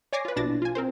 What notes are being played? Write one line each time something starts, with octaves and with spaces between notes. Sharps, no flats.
C#5 D5 G#5 D6 A#6 C7
F4 B4
A#1 B2 D4 E4 A6 A#6
F4 G#5
C4 A#4 C5